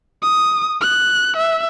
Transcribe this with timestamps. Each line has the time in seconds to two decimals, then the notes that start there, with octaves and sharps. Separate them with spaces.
0.22 D#6
0.81 F#6
1.37 E5